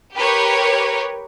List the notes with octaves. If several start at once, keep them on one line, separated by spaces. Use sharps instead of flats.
G4 A#4 B4 C#5